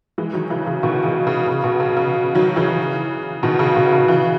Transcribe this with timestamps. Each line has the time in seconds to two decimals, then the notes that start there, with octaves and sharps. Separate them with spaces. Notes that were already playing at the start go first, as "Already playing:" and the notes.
0.18 E3 G#3
0.33 D#3 F#3
0.50 C#3 E3
0.67 C#3
0.83 B2 D#3
1.04 C#3 E3
1.27 C#3
1.47 C#3
1.64 B2
1.80 C#3
1.97 C#3
2.35 D#3 F#3
2.56 C#3 E3
3.43 B2 D#3
3.59 C#3
3.76 B2
3.92 C#3
4.08 C#3 E3